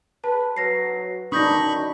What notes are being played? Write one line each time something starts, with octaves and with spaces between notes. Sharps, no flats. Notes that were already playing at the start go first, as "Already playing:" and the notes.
B4 A5
F#3 B4 A#6 C7
F#2 D4 D#4 B5 C#6 D#6 G6 A#6